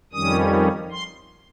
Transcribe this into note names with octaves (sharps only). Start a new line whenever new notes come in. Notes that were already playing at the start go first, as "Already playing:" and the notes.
F2 D#3 G3 C#4 D#6
C6